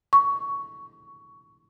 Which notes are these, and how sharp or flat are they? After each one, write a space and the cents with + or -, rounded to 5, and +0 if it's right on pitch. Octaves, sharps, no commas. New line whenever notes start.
C#6 +15